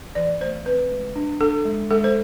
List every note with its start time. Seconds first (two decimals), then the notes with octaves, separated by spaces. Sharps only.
0.15 E3 D5
0.41 A3 C5
0.66 C4 B4
0.91 G#3
1.16 D4
1.41 D4 A4
1.65 G#3
1.91 G#3 A4
2.04 C5